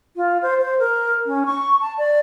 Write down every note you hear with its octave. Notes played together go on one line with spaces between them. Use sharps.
F4
C5
C5
A#4
C#4
C#6
A5
D5